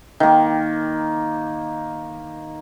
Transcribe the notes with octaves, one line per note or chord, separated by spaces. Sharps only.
D#3 A#3